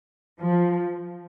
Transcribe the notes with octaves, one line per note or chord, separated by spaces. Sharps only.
F3